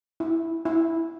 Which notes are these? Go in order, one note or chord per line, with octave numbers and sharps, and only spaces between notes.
E4
E4